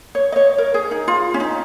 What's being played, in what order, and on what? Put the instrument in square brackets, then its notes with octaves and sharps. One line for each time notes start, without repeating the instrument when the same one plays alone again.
[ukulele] C#5
D#5
C#5
A#4
G#4
D#4
F4
C#4
D#4